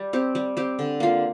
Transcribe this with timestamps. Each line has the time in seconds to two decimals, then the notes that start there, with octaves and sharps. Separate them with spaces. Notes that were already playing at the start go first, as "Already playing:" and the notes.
Already playing: G3
0.13 C4 G4
0.35 G3
0.57 C4 G4
0.79 D3
1.00 A#3 F4